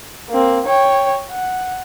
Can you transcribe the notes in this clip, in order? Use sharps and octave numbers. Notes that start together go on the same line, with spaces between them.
A#3 C4
C#5 G5
F#5